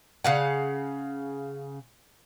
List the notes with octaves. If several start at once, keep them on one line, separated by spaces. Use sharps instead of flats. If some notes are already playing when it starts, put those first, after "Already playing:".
C#3 F5 F#5